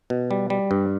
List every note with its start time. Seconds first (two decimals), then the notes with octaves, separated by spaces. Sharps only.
0.10 B2
0.31 G3
0.50 G3
0.71 G2